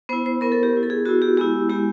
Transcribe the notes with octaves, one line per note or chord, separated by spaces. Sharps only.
B3 E4 C5
C5
B3 E4 A#4
A4
G4
B3 E4
A4
G#4
B3 E4 F#4
G4
G#3 B3 E4 G4
G#3 B3 E4 G4